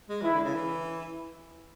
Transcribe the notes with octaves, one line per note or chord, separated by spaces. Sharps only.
G#3
E3 E4
D3
C#3
E3